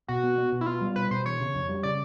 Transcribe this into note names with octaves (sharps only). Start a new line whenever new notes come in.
B2 F#4
B3
B3
B2
E4
B3 F4
G3
B2 B4
B2 C5
E3 C#5
C#3
F2
G3
C#3 D5